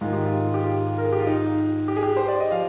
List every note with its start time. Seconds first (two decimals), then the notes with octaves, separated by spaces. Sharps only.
0.01 G#2 D#3 F4
0.13 G4
0.25 F4
0.54 G4
0.64 F4
0.98 A#4
1.04 G#4
1.12 G4
1.20 F4
1.27 D#4
1.88 G4
1.97 G#4
2.03 G4
2.17 C5
2.28 D5
2.40 D#5
2.51 F3 F5